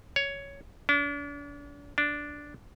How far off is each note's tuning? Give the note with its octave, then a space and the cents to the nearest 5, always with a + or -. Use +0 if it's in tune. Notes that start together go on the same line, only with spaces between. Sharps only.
C#5 +10
D4 -40
D4 -5